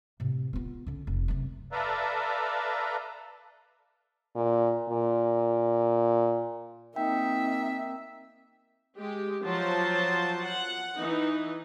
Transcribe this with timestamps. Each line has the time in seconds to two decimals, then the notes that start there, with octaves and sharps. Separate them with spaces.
0.20 A2 C3
0.53 B3 F4
0.87 D3 C#4
1.07 F1
1.28 F#2 C3
1.72 A4 B4 D5 E5 F5 A#5
4.36 A#2
4.90 A#2
6.96 A#3 C4 D#4 E5 G5
8.96 G#3 G4
9.44 F3 F#3 C5 A5
10.44 F#5
10.96 E3 D#4